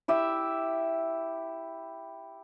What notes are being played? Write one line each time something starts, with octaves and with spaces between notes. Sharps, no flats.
E4 G4 E5